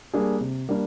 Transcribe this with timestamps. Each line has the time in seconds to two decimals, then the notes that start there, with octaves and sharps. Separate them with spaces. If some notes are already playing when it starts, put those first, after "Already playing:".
0.14 G3 A#3 D4 G#4
0.41 C3
0.69 G3 A#3 D4